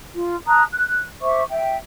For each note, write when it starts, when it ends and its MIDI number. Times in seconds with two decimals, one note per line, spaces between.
0.14 0.34 65
0.48 0.63 81
0.48 0.63 82
0.48 0.63 87
0.48 0.63 90
0.72 1.03 90
1.21 1.42 72
1.21 1.42 76
1.21 1.42 85
1.21 1.42 86
1.49 1.77 76
1.49 1.77 79